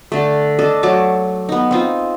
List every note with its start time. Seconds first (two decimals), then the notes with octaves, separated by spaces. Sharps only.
0.12 D3 A3
0.59 D4 A4 D#5
0.83 F#3 A3 A5 D6
1.49 B3 D#4
1.71 C4 D#4 F4